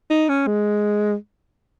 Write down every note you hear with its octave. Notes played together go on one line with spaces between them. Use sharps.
D#4
C#4
G#3